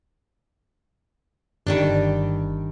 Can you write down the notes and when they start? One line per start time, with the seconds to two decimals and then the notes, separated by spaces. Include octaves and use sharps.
1.67 G1 D#3 G3 D4